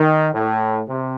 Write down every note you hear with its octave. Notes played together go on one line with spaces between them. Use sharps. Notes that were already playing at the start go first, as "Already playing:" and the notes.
Already playing: D#3
A2
C3